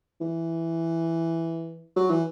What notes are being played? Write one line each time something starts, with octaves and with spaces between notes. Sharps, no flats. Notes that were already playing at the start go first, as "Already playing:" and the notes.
E3
F#3
E3